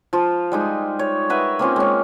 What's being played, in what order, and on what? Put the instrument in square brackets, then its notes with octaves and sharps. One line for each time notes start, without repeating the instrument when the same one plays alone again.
[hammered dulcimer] F3 F4
G3 G#3 D#4
C#5
A#4 B4 E5 F#5
A#3 C4 C#4 F4
G#3 C#4